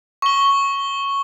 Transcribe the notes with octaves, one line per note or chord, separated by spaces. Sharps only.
C#6 G7